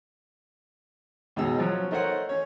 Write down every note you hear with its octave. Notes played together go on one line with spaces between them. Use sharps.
C#2 B2 D#4 G#4 E6
F3 F#3 C#4
A3 D#4 A#4 C5 C#5 F#5
C#4 C#5